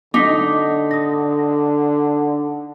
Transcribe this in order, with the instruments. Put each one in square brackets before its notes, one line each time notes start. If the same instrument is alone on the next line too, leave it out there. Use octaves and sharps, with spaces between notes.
[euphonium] D3 [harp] D#4 [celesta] D6 B6
[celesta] D#6 A#6